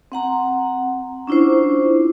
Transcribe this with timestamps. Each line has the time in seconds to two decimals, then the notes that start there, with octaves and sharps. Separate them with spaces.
0.12 C4 F#5 A#5
1.27 C#4 D4 E4 F4 C5